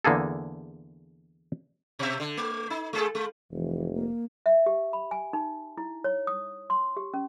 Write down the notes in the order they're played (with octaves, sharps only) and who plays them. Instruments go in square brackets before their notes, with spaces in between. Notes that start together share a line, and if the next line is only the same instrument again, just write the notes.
[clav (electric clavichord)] E2 D3 A#3 G#4 A4
[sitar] B2 E5
D3
A3
D#4
G#3 G#4 A4
G#3
[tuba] F1 [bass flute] E3
[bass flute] A#3
[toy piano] E5
G4
B5
G#5
D#4
E4
C#5
D#6
C6
G4
C#4